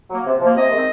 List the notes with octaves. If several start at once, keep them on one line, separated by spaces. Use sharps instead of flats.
F#3 A#3
C3
F3 A#3
C3 D#5
D#3 G#3 C4